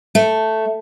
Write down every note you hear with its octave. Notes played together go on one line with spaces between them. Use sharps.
A3